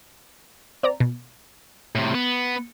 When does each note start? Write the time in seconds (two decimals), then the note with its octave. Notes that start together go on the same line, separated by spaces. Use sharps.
0.83 C4 D5 A#5
1.00 B2
1.95 A2 C3
2.15 B3